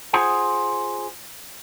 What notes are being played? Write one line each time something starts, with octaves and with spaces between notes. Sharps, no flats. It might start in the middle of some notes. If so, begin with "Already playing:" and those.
F4 G#4 C5 F#5 G#5